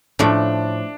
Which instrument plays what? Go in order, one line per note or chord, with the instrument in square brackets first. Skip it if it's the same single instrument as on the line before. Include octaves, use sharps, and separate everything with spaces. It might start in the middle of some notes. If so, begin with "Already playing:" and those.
[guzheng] A2 F3 A3 [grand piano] D4